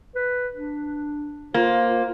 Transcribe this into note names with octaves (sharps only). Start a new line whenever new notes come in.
B4
D4
A#3 F4 C5